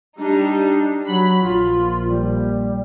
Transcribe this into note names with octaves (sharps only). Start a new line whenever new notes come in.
G3 D4 D#4
F#3 B5
A#1 F4
G3